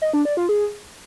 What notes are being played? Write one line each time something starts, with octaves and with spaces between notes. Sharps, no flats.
D#5
D4
D5
F4
G#4